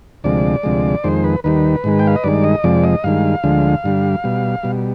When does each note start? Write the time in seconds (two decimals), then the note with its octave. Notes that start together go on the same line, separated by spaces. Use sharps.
0.24 D2 C3 F3 G#3 D5
0.63 D2 C3 F3 G#3
1.04 F2 D#3 G#3 C5
1.24 B4
1.44 D#2 D#3 G3 B4
1.84 G#2 D#3 G#3
1.99 G5
2.07 F5
2.16 D#5
2.24 G2 D#3 G#3 D5
2.44 D#5
2.64 F2 C3 F3 G#3 D5
2.84 D#5
3.04 G2 D#3 G#3 F5
3.44 D2 D3 F3 G#3
3.84 G2 D3 G3
4.24 B2 G3
4.63 B2 G3